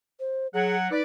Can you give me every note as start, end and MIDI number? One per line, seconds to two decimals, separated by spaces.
0.20 0.47 72
0.54 0.87 54
0.54 0.76 68
0.54 0.87 78
0.90 1.01 63
0.90 1.02 71
0.90 1.02 74